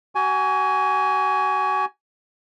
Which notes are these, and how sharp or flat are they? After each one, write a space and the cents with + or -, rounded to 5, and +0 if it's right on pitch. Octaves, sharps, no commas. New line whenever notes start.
F#4 +35 G#5 +0